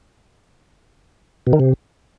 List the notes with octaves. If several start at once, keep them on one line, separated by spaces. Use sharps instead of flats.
B2
D#3
C3